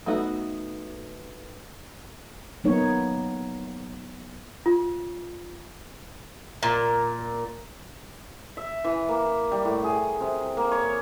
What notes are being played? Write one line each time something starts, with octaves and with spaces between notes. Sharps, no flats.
A3 B3 D#4 F#4
F#3 A#3 B3 D#4 C#5
F4
A#2
E5
E3
A#3
G3
A2
G#4
C3
A#3
C#5